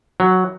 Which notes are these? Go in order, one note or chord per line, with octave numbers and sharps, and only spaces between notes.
F#3